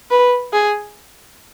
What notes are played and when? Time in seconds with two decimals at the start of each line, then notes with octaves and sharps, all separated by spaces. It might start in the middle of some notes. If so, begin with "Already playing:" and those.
0.11 B4
0.53 G#4